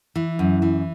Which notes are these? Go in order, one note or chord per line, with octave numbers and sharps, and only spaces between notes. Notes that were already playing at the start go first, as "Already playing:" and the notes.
E3
F#2
E3